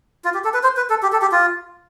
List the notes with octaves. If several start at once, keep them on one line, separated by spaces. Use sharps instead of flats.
F4
G4
A4
B4
C5
B4
A4
G4
A4
G4
F4